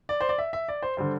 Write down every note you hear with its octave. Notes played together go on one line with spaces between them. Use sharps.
D5
C5
D5
E5
E5
D5
C5
D3 G3 C5